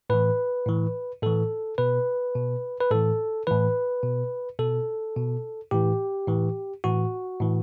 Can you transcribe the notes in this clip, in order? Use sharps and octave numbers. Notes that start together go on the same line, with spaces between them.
A2 E3 B4
A2 E3
A2 E3 A4
B2 B4
B2
B4
A2 E3 A4
A2 E3 B4
B2
B2 A4
B2
A2 E3 G4
A2 E3
A2 E3 F#4
A2 E3